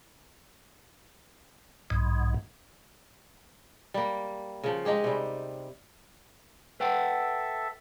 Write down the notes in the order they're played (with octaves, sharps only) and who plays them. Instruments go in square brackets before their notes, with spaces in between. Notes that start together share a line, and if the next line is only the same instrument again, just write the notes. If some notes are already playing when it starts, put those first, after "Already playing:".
[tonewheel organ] B1 G#2
[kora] G3 A#3
C#3 F3
G#3 D#4 G4 G#4
C3 G3
[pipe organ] A4 E5 [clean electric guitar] B4 F#5 G5